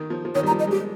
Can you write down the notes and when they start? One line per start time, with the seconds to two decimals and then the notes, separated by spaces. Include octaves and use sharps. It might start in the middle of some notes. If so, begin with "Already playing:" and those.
Already playing: D#3
0.10 F3
0.25 F3
0.35 D#3 C#5
0.43 G3
0.47 A#5
0.51 F3
0.59 D#5
0.67 G#3 G4